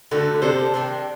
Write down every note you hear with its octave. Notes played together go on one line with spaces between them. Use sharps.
D3 A3 D#4 F#4 A4
D3
C3 A#3 D4 A4 C5
C3 D#3 G3 D4